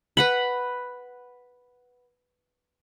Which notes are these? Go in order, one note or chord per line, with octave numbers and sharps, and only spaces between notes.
B4 F#5 B5